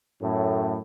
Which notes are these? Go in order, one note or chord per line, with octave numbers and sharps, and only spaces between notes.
F#2 A2